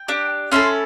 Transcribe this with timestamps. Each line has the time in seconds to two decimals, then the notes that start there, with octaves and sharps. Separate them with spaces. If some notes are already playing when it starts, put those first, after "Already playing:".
Already playing: G5
0.08 D4 G4
0.52 C#4 E4 A4 C6